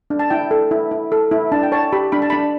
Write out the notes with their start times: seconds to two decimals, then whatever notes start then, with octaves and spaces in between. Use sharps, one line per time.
0.10 D4
0.19 A5
0.30 E4 G5
0.51 A4
0.71 E4
0.91 E4
1.12 A4
1.32 E4
1.52 D4 A5
1.63 G5
1.72 C#5 A5
1.92 G4 B5
2.12 D4 B5
2.22 A5
2.30 D4 B5